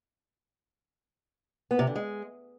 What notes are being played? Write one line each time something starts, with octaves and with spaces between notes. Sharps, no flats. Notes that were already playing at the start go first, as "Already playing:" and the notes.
B3
C3
D3
G#3